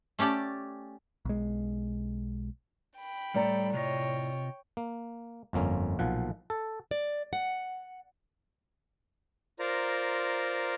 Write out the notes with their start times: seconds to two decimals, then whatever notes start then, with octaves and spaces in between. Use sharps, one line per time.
0.19 A3 C#4 G4 D5 A5
1.25 B1 G#3
2.98 G5 B5
3.34 A2 G3 A4 D5 A#5
3.73 C3 F4 C#5 D#5 G5
4.77 A#3
5.53 G1 F2 A#3 C#4
5.99 B1 A#2 F3 F#5
6.50 A4
6.91 D5
7.33 F#5
9.59 F4 A#4 C5 D5 A#5